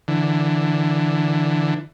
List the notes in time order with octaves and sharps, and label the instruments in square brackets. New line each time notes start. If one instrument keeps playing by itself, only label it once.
[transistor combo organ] D3 E3